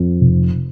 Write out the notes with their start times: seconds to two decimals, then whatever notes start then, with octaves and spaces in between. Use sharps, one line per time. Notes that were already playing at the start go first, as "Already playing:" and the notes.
Already playing: F2
0.21 F1